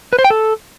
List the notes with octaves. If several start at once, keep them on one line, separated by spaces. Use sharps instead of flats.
B4
C5
G5
A4